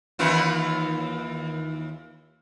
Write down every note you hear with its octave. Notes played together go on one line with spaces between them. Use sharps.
D#2 E3 F4